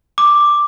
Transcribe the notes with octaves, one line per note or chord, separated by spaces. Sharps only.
D6